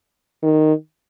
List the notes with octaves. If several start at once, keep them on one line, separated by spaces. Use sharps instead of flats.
D#3